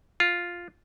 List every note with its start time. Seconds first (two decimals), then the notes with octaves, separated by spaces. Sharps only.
0.20 F4